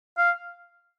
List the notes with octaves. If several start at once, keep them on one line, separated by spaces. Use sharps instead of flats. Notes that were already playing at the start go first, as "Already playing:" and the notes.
F5